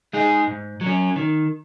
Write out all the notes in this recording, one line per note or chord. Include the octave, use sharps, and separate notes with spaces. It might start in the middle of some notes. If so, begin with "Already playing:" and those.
G#3 D#4 G#4
G#2
F#3
C#4
D#3